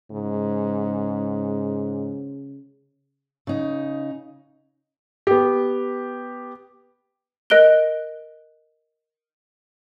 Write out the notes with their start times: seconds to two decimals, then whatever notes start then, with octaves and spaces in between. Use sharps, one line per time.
0.11 G#2 C#3
3.47 C#3 D#4
5.27 B3 G4
7.50 A#4 D#5 F#6 D7 G7